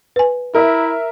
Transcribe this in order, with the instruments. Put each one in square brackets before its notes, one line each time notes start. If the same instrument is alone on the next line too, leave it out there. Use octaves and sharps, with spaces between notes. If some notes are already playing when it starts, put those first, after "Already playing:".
[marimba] B4 G#5
[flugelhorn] E4 [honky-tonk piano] A#4 E5